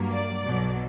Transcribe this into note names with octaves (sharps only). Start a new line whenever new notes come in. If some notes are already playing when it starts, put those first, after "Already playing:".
Already playing: G2 F#3 A#3
D5
B1 B2 F#3